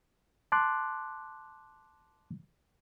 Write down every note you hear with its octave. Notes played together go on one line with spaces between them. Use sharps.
A5 C6 D6 F#6